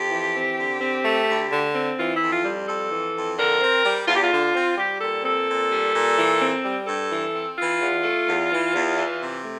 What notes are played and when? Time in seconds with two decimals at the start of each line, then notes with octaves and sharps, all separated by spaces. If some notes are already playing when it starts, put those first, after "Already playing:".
Already playing: F2 G4
0.11 E3
0.35 C4
0.58 D3
0.81 C4
1.05 A3
1.28 D2
1.51 D3
1.75 C4
1.98 E3 F4
2.15 E4
2.21 F2
2.33 F4
2.45 G3
2.68 F2 A4
2.91 E3
3.15 F2
3.38 D3 A#4
3.61 C4
3.85 G3
4.08 E2 F4
4.16 G4
4.23 F4
4.32 D3
4.55 C4
4.77 G3 G4
5.01 A#2 A4
5.24 C4 A4
5.48 A#2
5.71 G3
5.95 A#2
6.18 E3
6.41 C4
6.65 G3
6.87 G2 A4
7.11 E3
7.34 C4
7.57 E3 F4
7.81 E2
8.03 A3
8.27 E2
8.51 E3
8.74 E2
8.97 E3
9.20 C3
9.43 A3